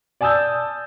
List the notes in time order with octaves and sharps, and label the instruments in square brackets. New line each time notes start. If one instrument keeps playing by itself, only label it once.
[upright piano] D5 G#5 A5 D#6 E6 G6